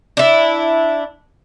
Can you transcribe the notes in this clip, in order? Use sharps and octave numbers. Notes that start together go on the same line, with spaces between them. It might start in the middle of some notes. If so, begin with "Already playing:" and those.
D4 E4